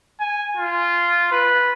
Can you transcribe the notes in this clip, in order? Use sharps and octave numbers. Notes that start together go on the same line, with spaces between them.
G#5
F4
B4